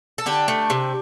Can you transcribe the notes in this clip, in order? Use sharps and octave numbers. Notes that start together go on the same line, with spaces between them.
A4
D3 D4 G4
A3
C3